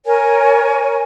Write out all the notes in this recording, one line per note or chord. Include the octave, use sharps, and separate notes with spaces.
A#4 C#5 G#5